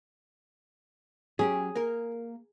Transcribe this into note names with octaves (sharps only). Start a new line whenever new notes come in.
F#3 C#4 G4 G#4
A#3 A#4